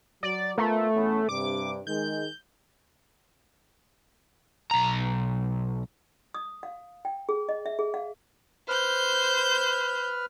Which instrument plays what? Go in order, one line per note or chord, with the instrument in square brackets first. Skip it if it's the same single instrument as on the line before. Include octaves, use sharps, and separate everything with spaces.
[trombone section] F#3 [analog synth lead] D5
[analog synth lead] A3 [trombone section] B3 F4 A#4
[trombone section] E2 B3 C#4
[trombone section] G2 C3 [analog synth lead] D6
[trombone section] D#3 G#3 [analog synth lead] G6
[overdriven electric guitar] B1 A#5
[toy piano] D#6
F5
G5
G#4
D#5
E5
G#4
F5
[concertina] B4 F6 [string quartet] C5 G6